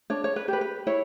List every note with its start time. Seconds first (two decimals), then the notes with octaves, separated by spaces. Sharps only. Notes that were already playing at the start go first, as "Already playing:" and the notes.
0.10 D4 C#5
0.24 C#5
0.36 B4
0.48 G4 B4
0.61 B4
0.87 E4 C#5